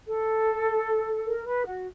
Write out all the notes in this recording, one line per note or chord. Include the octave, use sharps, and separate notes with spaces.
A4
A#4
B4
F#4